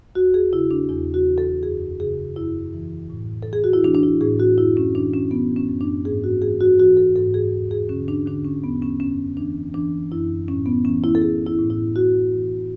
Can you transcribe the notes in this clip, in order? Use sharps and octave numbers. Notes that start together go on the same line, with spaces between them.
E2 F#4
G#4
C#3 E4
D4
E2 E4
F#4
E3
A4
F#2 G#4
C#3 G#4
F#2 E4
E3
A2
A4
E3 G#4
F#4
E4
E3 D4
D4
E4
A2 G#4
F#4
F#2 E4
C#4
E3 D4
C#4
E3 B3
C#4
F#2
D4
G#2 G#4
F#4
E3 G#4
F#4
E3 F#4
A4
G#2 A4
G#4
E2
G#4
D3 C#4
D4
D3 D4
C#4
E2 B3
C#4
F#2 C#4
E3 D4
E3 D4
F#2 E4
A2 C#4
B3
E3 C#4
E4
A4
E3 G#4
E4
A2
E4
A2 F#4
E3